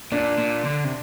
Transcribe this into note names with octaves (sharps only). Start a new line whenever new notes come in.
A#2 D4
A#2
D3
C3